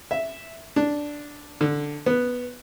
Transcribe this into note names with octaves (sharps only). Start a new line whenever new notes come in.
E5
D4
D3
B3